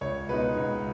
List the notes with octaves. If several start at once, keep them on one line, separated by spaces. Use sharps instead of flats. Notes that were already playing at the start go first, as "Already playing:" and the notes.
C#2 C#5
B2 G#3 D#4 B4
C#2